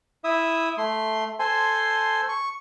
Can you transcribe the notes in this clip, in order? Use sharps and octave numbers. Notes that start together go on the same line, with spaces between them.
E4 E5 D#6
A3 C6
A4 C5 G#5 C6
C#6